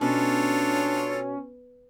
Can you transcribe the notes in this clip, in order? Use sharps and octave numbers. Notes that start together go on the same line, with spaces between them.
B2 C#4 D4 F4 A4 C#5